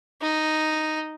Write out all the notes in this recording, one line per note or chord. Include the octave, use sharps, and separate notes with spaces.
D#4